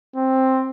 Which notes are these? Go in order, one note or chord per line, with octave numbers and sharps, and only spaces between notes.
C4